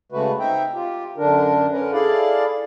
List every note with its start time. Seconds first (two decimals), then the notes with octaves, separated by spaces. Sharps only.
0.12 C#3 G#3 A3 F#4 B4
0.40 C4 D#4 E5 G5 A#5
0.74 F4 G4
1.17 F#2 D3 D4 A#4
1.71 D3 C#4 A#4 B4
1.93 E4 G#4 A4 D5 F5